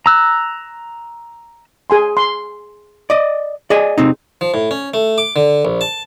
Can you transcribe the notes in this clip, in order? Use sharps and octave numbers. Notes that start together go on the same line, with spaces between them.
A#5 E6 F#6
G#4 G#5 C6
C6
D5 D#5
G#4 D5 D#5 G#5
C3 C4 D#4
F3
A2
C#4
A3
D6
D3
A#1
A5